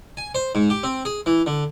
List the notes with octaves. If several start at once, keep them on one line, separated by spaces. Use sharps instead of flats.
G#5
C5
G#2
G4
C4
G#4
E3
D3